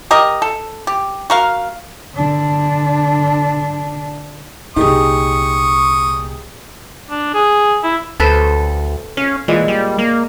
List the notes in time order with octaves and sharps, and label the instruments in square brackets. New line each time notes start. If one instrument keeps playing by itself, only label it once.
[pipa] G4 A#4 D#5
A4
G4
F#4 A#4 F5
[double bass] D3 D4
[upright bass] C2 A#2 [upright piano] D#4 G4 G#4 [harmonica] C#6 D#6
[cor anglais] D4
G#4
E4
[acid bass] D2 [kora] A4 B4 C5
[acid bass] C#4 [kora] F5
[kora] A#2 G#3 [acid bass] E3
[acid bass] G3
A#3